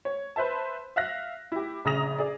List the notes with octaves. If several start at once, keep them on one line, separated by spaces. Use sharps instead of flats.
C#5
B4 C5 E5 A5
E5 F5 F#6 A#6
E4 G4
A#1 C#3 A#5 D#6 A#6 F7
G#4 D5